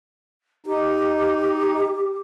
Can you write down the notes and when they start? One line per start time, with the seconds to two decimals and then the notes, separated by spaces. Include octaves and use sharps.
0.66 D#4 G4